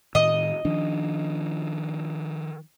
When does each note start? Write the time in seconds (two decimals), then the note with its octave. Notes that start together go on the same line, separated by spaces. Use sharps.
0.15 A2 D#3 D#5
0.65 D#3 F3 D4